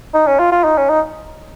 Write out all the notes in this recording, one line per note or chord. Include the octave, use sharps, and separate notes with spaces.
D#4
C#4
F4
F4
D#4
C#4
D#4